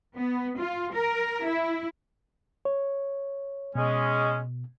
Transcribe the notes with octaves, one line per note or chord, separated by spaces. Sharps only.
B3
F4
A#4
E4
C#5
B2 G#3 C#4